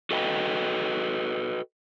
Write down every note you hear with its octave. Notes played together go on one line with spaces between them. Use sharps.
F#4 A4 B4 D#5 G5